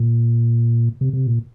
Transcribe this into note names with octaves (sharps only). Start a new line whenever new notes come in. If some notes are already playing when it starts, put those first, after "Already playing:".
Already playing: A#2
C3
C3
A#2